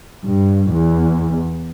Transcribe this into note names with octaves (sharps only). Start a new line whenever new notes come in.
G2
E2